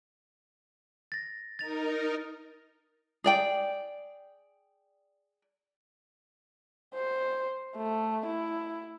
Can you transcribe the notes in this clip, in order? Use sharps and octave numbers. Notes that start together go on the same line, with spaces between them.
A6 A#6
D#4 A#4 A6 F7
G#4 D5 G5
C5
A3
E4